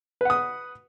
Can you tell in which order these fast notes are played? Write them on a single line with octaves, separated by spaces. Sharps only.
B4 F#5 D#6